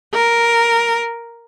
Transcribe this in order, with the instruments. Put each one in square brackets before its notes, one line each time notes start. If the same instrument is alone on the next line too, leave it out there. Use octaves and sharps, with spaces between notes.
[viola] A#4